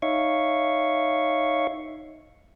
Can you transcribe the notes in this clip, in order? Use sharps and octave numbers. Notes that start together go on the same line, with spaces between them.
D#4 C#5 E5 F5 C#6